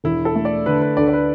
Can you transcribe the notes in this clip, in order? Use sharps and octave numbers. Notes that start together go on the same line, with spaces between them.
E1 E4
A4
A3
D5
D3 B4
B4
D2 D5
D5
B4